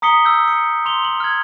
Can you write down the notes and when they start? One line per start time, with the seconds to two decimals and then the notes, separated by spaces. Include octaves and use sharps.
0.02 A#5 D#6 B6 C#7 G7
0.25 E6 G6
0.48 C#7
0.85 C6 F7 G7
1.05 F#7
1.20 F6 G#6